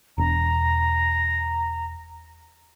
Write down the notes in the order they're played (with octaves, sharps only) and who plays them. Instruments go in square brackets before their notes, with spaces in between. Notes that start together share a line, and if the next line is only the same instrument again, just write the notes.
[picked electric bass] E1 C4 D4 [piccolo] A#5